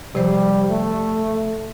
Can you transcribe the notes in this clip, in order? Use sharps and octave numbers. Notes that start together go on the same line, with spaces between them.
C3 F3 G3 C5
A3